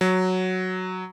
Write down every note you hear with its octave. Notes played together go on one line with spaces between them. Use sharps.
F#3